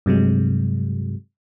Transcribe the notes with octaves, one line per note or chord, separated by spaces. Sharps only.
G2 C3 F#3 G#3